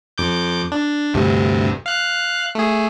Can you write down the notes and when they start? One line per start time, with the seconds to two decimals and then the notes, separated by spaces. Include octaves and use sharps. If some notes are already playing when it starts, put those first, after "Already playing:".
0.18 F2 D6 G6
0.72 D4
1.14 D2 G2 C3
1.86 F5 F#6
2.55 A3 G#4